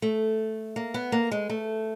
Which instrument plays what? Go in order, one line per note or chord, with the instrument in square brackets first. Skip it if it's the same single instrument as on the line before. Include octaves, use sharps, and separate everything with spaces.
[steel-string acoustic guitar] A3
A#3
B3
A#3
G#3
A3